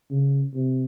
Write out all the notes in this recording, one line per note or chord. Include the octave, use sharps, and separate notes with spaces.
C#3
C3